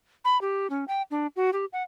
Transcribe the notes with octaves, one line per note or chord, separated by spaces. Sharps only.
B5
G4
C#4
G5
D4
F#4
G4
F#5